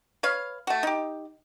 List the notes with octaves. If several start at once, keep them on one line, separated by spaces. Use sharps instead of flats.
B4 C#5 F5
A3 F#4
D#4 G4